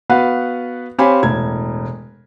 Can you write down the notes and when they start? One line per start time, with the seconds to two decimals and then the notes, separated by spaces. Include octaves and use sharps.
0.10 B3 F#4 B4 F5 F#5
0.98 C4 G4 C#5 F5 G#5 B5
1.23 E1 A2 G#6